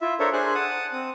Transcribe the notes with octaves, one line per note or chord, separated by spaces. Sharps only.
E4 F4 E5
D4 A4 A#4 C5 C#5 E5
D4 G#4 C5 G#5 F#6
F#5 A5 D#6
C4 D#6